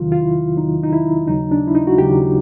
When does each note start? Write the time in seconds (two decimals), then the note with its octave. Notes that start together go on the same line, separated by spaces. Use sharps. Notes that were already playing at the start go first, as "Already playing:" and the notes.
Already playing: E2 C3 D#3 F#3 F4
0.12 F4
0.22 E4
0.56 E2 C3 D#3 F#3 D#4
0.83 D#4
0.93 E4
1.27 D#2 C#3 F#3 D#4
1.52 D4
1.67 E4
1.75 D#4
1.87 F#4
1.98 D#2 C#3 F#3 G4